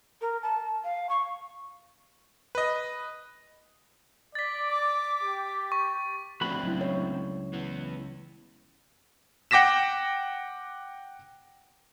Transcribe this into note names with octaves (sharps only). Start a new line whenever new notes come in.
A#4
A5
F5
C#6
B4 D#5
D5 A6 B6
D6
G4
C#6
F3 A3 C4 D4 F#4 B5
C#2 F#3 E4
C#5
E3 B3
F#5 G5 D6 A#6 B6 E7